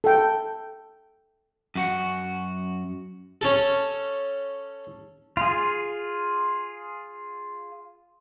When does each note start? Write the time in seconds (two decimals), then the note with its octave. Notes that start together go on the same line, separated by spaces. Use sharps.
0.04 A4 G5
1.75 F#2 F#4 F#5
3.41 C#4 A4
5.37 F4 G#4